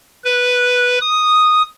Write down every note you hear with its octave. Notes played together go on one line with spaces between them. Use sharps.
B4
D#6